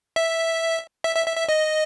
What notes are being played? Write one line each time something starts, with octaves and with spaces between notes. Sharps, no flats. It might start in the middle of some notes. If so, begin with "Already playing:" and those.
E5
E5
E5
E5
E5
D#5